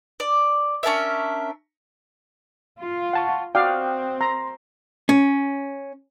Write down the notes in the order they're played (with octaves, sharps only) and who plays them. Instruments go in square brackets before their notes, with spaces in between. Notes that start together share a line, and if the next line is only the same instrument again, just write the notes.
[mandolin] D5
C#4 D4 A#4 E5
[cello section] F4
[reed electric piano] F#5 A5 C#6
[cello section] C4 [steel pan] F#4 D5 F5 [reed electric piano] G5 D#6 F#6
[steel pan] A#5 [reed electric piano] C6
[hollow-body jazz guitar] C#4